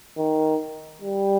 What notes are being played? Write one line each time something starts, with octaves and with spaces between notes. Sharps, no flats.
D#3
G3